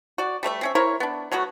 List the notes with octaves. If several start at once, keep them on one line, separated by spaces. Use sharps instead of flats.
F#4 D5
G3 A3 C#5 E5
C4 C#4 E5
E4 A#4 C5 C#5
B3 D4
F#3 A3 B3 F#4